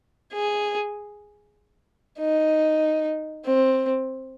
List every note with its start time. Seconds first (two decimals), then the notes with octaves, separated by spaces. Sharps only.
0.33 G#4
2.19 D#4
3.45 C4